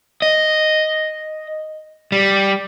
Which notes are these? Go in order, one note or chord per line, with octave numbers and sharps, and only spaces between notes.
D#5
G3